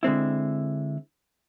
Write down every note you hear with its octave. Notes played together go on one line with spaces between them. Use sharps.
D3 G#3 C4 E4